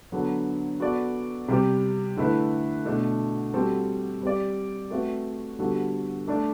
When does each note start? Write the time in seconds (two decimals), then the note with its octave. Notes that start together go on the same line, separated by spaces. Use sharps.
0.12 D3 F#3 B3 D4 A4
0.80 B3 F#4 A4 D5
1.48 C3 G3 C4 G4
2.17 D3 A3 E4 B4
2.85 B2 A3 D4
3.54 G3 C4 F#4 A4
4.22 G3 C4 G4 D5
4.90 A3 C4 F#4 B4 E5
5.59 D3 G3 B3 F#4 A4
6.28 A3 D4 A4 D5